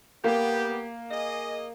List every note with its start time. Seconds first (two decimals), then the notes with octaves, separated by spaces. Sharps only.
0.24 A#3 B3 G4
1.10 G#4 D#5